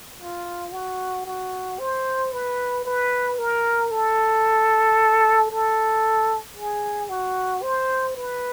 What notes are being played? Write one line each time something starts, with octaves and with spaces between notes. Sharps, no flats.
F4
F#4
F#4
C5
B4
B4
A#4
A4
A4
G#4
F#4
C5
B4